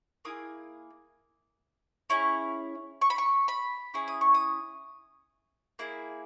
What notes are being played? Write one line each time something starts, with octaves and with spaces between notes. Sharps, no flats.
A#3 E4 G#4 D#6
C#4 E4 G#4
C#6
B5
C#6
B5
C#4 E4 G#4
D#6
C#6
D#6
A#3 E4 G#4